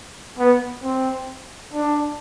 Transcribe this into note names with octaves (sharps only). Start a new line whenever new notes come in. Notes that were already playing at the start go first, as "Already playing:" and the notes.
B3
C4
D4